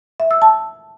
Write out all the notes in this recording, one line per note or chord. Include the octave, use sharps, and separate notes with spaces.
E5
E6
A5